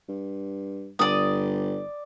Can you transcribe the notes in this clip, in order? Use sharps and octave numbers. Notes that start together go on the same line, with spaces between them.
G2
G1 D5 D#6